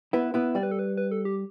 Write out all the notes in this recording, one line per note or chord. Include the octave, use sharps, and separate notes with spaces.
B3 E4 B4
B3 E4 B4
G3 D5
B4
A4
B4
B4
A4
G4